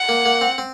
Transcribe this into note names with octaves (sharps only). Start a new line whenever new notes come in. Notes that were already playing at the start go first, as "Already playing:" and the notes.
Already playing: F#5
A#3
A#3
C4
C4